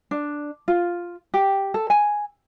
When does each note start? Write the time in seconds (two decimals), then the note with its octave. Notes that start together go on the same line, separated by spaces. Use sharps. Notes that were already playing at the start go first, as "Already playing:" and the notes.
0.11 D4
0.68 F4
1.34 G4
1.74 A4
1.90 G#5